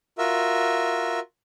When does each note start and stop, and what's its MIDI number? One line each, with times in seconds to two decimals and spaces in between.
0.18 1.20 65
0.18 1.20 66
0.18 1.20 70
0.18 1.20 76